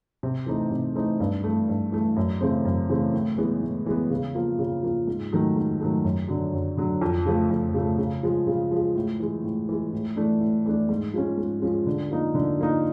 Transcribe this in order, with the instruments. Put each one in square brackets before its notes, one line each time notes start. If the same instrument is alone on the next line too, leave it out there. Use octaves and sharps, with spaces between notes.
[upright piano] C3
E3 A3 C4 D#4
C3
E3 A3 C4 D#4
G2
E3 A3
G2
E3 A3
F#2
C#3 E3 A3 C4
F#2
C#3 E3 A3 C4
A2
E3 G#3 B3
A2
E3 G#3 B3
C#3
F3 A#3
C#3
F3 A#3
G#2
D#3 F#3 A3
G#2
D#3 F#3 A3
F#2
D3 F#3
F#2
D3 F#3
F2
C#3 F3 A3
F2
C#3 F3 A3
C#3
F3 G#3
C#3
F3 G#3
A2
E3 G#3
A2
E3 G#3
A2
E3 A3 D4
A2
E3 A3 D4
G#2
F3 G#3 C#4
G#2
F3 G#3 C#4
D3
F3 A#3 D#4
D3
F3 A#3 D#4